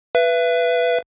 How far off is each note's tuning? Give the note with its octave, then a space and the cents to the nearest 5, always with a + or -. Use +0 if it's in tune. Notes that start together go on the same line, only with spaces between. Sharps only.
B4 +0 E5 +35